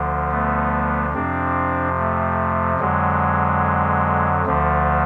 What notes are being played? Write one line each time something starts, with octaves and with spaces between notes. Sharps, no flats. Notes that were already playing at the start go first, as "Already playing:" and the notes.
Already playing: D2 D3 F3
A3 B3
F2 C3 F3 C4 D4
A3
F2 D3 F#3 G#3
D2 D3 F3 A3